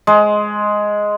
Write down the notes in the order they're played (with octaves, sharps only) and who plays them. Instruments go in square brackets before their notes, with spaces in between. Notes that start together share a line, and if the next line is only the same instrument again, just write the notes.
[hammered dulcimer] G#3